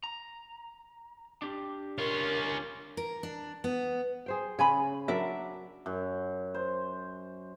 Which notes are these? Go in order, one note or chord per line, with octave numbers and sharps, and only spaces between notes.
A#5
D4 G4
C#4 F4 A#4
A#4
D4
B3
G#4 C5 G5
C#3 C#5 G#5 B5
F#3 D4 A#4 D5 E5
F#2
C5